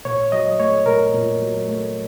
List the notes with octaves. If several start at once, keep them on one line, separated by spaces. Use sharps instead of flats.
A#2 C#5
F#3 D#5
A3 C#5
A#2 A#4
A#2
F#3
A3